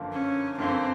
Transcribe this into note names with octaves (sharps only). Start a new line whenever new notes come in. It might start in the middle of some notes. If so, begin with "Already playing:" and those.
Already playing: G1 F#2 D3 F3 A#3
C#4
G1 F#2 D3 F3 A#3 C4